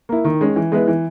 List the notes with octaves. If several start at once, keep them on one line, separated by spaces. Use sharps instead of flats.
A#3 E4
D#3
G#3 C#4
E3
G#3 B3 E4 B4
E3